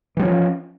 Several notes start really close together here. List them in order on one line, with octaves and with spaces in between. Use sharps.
E3 G3 C#4 F3